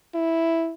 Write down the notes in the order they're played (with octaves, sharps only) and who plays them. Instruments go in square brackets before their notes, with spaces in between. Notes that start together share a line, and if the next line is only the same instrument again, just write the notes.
[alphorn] E4